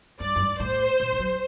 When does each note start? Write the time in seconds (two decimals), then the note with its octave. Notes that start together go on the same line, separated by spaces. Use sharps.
0.20 G2 D5
0.36 F#2
0.40 G2
0.59 A2 C5
1.00 A#2
1.12 D#3
1.19 F#3